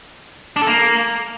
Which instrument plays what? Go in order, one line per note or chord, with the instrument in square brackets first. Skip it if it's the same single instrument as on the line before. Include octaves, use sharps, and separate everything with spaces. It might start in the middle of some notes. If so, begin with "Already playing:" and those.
[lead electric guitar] D4
A4
A#3